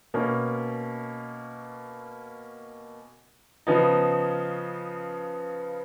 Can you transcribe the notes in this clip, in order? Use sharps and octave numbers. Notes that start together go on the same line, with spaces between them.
B2 A#3 C#4
C#3 F3 B3 D#4